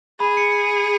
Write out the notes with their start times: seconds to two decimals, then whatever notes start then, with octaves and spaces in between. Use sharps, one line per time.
0.20 G#4 B5
0.37 C#7